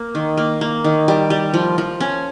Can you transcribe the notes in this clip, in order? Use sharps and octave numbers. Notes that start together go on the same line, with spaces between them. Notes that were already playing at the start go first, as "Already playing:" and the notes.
Already playing: A#3
D#3
A#3
A#3
D#3
G3
G3
F3
F3
C#4